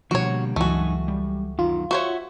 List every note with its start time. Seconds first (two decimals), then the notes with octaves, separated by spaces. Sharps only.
0.11 B2 D3 F3 G3 A#3 F#4 C#5
0.56 C#2 G2 E3 F#3 A3 D#4 F#4 G#5
1.08 G3
1.59 F#2 D#3 F4
1.91 F#4 C5 C#5 E5